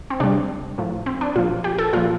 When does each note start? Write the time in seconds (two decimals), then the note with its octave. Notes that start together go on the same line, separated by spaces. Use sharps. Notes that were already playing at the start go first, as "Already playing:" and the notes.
0.10 C4
0.20 C3 G3 D4
0.78 A2 F3
1.06 C4
1.21 D4
1.36 A#2 F3 F4
1.64 G4
1.78 A4
1.93 A#2 F3 F4